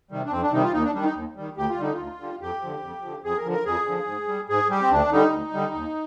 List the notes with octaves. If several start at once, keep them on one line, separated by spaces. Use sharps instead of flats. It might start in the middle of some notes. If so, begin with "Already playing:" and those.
C3 D#3 G3
D4
F2 C4
D4
C3 D#3 G3 D#4
F4
D#2 D#4
D4
D#3 G3 D4
D#4
D#2
D#3 G3
D2 G4
F4
D3 G3 D#4
D2 F4
D3 G3
F2 G4
D3 F3
F2
D3 F3
F2 G#4
A#4
D3 F3
A#4
F2 G#4
D3 F3
G#2
G3
G#2 G#4
G3 G4
C4
D2 D4
D3 G3 D#4
D2
D3 G3
D#2